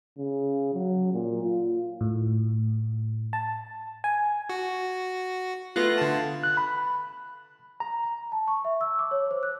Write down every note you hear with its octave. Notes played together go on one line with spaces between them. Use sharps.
C#3
F#3
A#2
F4
A2
A5
G#5
F#4
A3 B3 F4 F#6 A#6
D3 A5
F#6
B5
A#5
A5
C#6
E5
E6
D6
C#5
C5
F#6